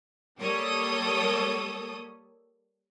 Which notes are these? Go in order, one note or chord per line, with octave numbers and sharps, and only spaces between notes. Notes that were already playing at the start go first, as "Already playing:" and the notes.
G3 A#3 A4 C#5 D#6